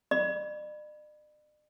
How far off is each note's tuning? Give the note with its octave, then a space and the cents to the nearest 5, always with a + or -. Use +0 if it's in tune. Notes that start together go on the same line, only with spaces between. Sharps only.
D5 +45 B5 +0